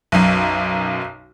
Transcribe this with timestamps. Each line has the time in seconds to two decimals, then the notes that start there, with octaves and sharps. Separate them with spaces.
0.12 B1 F#2